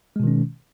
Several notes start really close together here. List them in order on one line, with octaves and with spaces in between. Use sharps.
G#3 B2 D#3 C#4